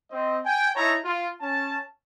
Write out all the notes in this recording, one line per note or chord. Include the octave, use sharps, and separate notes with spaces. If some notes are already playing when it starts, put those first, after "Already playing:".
C4 D#5
G5 G#5
D#4 E4 C#5 E5 A5 A#5
F4
C#4 A5